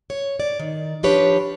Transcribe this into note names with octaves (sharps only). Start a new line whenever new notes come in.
C#5
D5
D#3
F3 D4 G4 B4 C#5